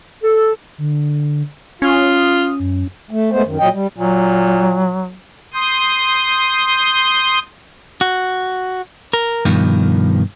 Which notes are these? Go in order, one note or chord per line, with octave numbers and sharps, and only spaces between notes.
A4
D3
C#4 F4 D#6
F#2
A3
G#3 A3 B3 C5
F#2 D#3
A#2 F#3 D#5 G5
G3
A#2 F#3
C6 D#6 G6
F#4
A#4
G2 B2 D#3 F3